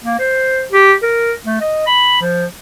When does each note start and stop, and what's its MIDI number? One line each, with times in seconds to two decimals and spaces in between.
0.04 0.19 58
0.19 0.65 72
0.72 0.93 67
1.03 1.33 70
1.45 1.58 57
1.61 1.83 75
1.86 2.20 83
2.21 2.45 53